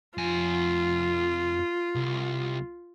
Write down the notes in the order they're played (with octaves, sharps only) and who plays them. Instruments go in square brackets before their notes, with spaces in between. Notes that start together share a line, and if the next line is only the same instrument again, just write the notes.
[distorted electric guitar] F2 G#5 [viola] F4
[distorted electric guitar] C2